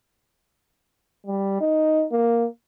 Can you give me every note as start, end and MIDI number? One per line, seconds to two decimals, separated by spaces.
1.26 1.60 55
1.61 2.06 63
2.12 2.47 58